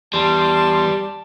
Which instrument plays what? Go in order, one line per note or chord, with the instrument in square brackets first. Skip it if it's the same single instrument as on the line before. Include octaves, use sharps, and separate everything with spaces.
[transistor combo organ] E2 C6 [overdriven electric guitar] G3 [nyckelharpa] A5